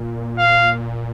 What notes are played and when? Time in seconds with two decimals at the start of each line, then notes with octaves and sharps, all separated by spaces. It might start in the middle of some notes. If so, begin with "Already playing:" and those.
Already playing: A#2
0.38 F5